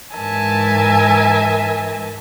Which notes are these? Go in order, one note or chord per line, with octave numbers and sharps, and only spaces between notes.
G#2 E3 A#4 E5 G#5 A5